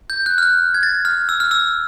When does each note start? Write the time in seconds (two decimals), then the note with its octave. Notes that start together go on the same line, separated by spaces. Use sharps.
0.10 G6
0.26 F#6
0.38 F6
0.43 F#6
0.74 G#6
0.83 A6
1.05 F6
1.29 E6
1.40 F6
1.51 E6